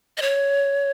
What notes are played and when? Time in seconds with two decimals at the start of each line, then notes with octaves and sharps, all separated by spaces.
0.18 D#5
0.22 C#5